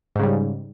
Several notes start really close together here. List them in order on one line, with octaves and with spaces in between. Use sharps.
G#2 C#3 G3